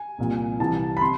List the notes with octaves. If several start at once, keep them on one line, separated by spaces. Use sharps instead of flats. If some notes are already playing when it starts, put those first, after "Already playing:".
Already playing: G#5
C2 A#2 F3
C2 C3 E3 A5
B5
C3 C6